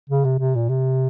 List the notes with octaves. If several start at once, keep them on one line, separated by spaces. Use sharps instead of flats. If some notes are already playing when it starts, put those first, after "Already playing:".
C#3
C3
C3
A#2
C3